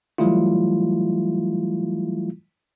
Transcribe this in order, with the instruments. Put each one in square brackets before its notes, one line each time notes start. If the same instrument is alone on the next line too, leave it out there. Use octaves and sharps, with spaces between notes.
[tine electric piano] E3 F#3 G3 A3 E4 F4